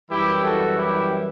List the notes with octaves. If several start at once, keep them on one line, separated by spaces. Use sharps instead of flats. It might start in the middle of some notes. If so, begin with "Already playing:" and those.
F#2 E3 G3 E4 G4
F#4 A4
E4 G4